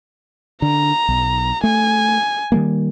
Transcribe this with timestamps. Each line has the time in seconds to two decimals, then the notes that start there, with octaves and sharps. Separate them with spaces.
0.62 D3 A#5
1.09 B1
1.64 A3 G#5
2.52 D#3 G3 A#3